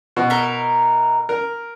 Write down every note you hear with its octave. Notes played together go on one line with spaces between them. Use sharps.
B2
D#4 E4 A#4
A#4